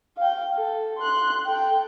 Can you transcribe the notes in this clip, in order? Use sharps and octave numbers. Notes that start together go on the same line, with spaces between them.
F5 G5
A4
C6 F#6
A4 G5